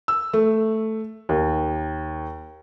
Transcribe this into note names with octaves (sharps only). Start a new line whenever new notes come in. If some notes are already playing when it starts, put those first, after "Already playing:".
E6
A3
D#2